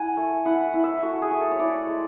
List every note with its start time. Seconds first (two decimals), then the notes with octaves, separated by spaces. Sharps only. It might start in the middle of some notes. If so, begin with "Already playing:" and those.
Already playing: E4 F#5 G#5
0.17 A3
0.45 E4 F#5
0.74 E4
0.84 E5
1.03 A3 F#4
1.22 G#4
1.31 A3
1.41 A4
1.51 C#5
1.59 E4 D5
1.87 G#3